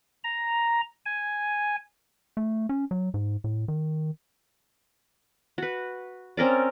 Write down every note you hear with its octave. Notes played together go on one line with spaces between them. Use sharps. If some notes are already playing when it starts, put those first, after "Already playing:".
A#5
G#5
A3
C#4
F#3
G#2
A2
D#3
F#4 B4
C4 C#4 A#4 D5